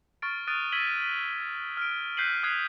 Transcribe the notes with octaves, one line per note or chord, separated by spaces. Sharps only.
C#6 F6 A6 D7
D#6 F6 F#6 A6 D7 D#7
E6 G#6 B6 D#7 F#7 G7
F6 D7
F#6 G6 B6 C7 D#7 F#7
D#6 F#6 G#6 C7